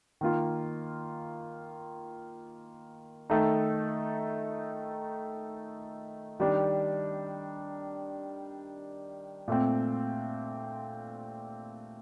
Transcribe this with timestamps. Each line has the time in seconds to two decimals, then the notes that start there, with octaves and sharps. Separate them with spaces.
0.21 D#3 A#3 F4
3.30 D#3 A3 D#4 A4
6.39 D#3 G3 D4
9.48 A#2 A3 C4